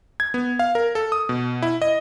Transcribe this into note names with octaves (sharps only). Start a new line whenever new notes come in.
G#6
B3
F5
A#4
A4
D#6
B2
E4
D#5